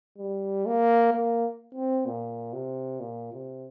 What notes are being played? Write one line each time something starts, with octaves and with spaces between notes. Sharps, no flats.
G3
A#3
A#3
C4
A#2
C3
A#2
C3